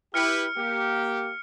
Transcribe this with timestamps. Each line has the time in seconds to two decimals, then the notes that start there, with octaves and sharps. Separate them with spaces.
0.14 E4 G4 B4 F6 C#7
0.57 A#3 G4